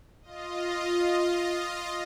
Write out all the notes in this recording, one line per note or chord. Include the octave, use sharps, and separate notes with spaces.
F4 D#5